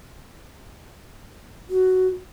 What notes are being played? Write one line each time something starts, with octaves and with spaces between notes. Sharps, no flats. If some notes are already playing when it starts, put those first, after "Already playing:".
F#4